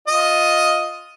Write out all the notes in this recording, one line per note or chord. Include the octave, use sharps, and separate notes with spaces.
F4 D#5